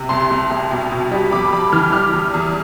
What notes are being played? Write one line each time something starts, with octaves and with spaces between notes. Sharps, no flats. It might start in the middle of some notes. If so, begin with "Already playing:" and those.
Already playing: C3
C2 A5 C6
C2
C2
B2
B2
G3
F2 B5 D6
F2 B5 D6
E3 D6 F6
G3 D6 F6
E2
E2